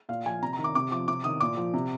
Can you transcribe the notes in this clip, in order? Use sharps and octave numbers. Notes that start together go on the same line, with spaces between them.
A#2 F5
F3 G#5
C3 A#5
A#5
D#3
D6
C3 D6
F3 D6
C3 D6
D#3 D#6
A#2 D6
F3
C3